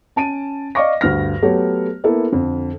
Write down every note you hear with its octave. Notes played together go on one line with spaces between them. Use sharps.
C#4 A5 D7 D#7
D5 D#5 F5 C#6 D6 A#6
D2 G2 F6 A#6
F#3 A3 B3 G4 C#5
A#3 B3 E4 A4
F2 D3